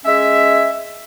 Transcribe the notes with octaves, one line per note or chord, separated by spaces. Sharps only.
G#3 C#4 E5